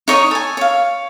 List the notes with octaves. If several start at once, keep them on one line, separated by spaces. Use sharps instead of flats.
D#4 C#5 D#5 C#6
A4 G#5
C#5 F5